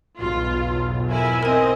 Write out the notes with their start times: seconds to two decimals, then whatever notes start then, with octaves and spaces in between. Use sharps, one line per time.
0.19 B1 E2 G#2 F4
1.08 E4 A#4 G#5
1.43 C4 A#4 D#5 G#5